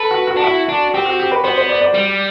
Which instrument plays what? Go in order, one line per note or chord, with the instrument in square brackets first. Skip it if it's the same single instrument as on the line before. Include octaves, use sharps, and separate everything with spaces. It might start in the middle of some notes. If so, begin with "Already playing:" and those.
Already playing: [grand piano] A4 [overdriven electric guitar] B4
[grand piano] F#4
F#4
[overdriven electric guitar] D4
[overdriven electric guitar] E4 [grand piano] F#4
[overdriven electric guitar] D4
[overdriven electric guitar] C4 [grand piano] G4
[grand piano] F#4
G4
B4
[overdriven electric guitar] B3 [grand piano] C5
[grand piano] C5
D5
D5
[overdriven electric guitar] G3